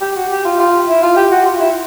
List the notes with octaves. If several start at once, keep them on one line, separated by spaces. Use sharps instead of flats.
G4
F#4
G4
F4
F4
E4
F4
G4
F#4
F4
E4